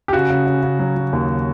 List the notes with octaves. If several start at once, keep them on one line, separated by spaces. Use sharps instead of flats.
G4
C#3 F#4
C#3
C#3
C#3
F#3
F#3
D#2